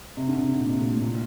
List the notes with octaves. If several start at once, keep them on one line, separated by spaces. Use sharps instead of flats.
C3
D3
C3
D3
A#2
C3
A#2
A2
A#2